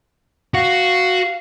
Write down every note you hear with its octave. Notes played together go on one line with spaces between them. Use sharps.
F#4 F5